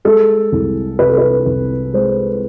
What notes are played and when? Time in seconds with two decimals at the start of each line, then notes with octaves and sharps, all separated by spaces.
0.05 G#3 A4
0.52 C2
0.99 C3 B4
1.09 A4
1.18 B4
1.46 C2
1.94 G#3 C5